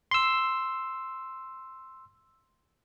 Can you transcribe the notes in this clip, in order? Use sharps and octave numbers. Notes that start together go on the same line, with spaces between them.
C6 E6